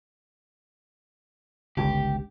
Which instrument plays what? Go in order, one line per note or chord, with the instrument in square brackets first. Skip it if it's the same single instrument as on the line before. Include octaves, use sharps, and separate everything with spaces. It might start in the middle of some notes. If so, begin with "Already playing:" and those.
[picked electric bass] G1 C#2 [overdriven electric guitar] G4